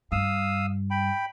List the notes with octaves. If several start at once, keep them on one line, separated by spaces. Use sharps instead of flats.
G2 F5 D#6 E6
G5 B5